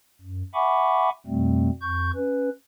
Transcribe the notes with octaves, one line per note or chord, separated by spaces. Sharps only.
F#2
E5 F#5 G#5 B5 C#6 D6
F2 B2 G3 A3 C4
F2 C#6 G6
C#4 B4